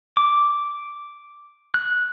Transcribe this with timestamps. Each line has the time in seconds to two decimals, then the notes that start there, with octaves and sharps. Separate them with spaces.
0.17 D6
1.74 F#6